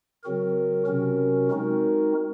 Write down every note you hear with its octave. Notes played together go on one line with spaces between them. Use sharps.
C#3 F#3 C4 F#4 A#4
C3 F#3 C#4 F#4 A#4
G#3 C4 D#4 F#4 A#4